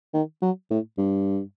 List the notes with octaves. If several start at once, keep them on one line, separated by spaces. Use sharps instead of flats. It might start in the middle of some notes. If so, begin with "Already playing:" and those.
D#3
F#3
A2
G2